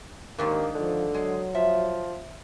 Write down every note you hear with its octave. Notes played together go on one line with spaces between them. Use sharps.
D#2 G#2 D#3 A#3 D4
D3 F3
F#3 G#3
F3 E5